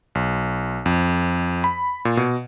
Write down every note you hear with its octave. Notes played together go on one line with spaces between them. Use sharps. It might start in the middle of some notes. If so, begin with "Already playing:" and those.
B1
F2
B5
A#2
B2